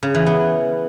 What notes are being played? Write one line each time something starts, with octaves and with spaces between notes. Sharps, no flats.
C#3
E3
B3